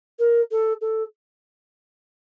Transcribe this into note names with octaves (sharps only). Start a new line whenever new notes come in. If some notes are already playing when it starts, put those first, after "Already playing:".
A#4
A4
A4